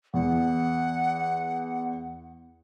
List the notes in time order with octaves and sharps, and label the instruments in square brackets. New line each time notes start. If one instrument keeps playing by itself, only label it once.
[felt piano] E2 [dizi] F#5